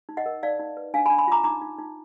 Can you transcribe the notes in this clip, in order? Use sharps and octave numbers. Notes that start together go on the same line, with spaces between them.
D#4
D#5 F#5
A#4
D#4 D5 F5
D#4
B4
D4 F5 G#5
G#5 B5
D4
G#5 B5
F4 A#5 D6
D#4 A#5 D6
D#4
D#4